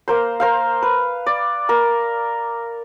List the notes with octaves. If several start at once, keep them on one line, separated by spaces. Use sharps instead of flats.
A#3 A#4 C5
A#4 C5 F5
B4
D5
A#4